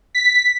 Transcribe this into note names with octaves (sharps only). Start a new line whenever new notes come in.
B6